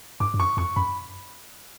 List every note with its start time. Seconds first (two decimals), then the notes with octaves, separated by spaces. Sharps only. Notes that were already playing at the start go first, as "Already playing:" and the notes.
0.20 G2 D6
0.34 G2
0.39 F#2 C#6
0.57 F2 C#6
0.76 F#2 B5